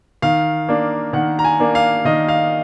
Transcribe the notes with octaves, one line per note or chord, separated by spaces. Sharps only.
D#3 F5
A#3 D4
D#3 F#5
A#5
G#5
A#3 D4
F5
D#3 D#5
F5